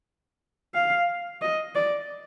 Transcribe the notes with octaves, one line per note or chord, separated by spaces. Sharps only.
F5
D#5
D5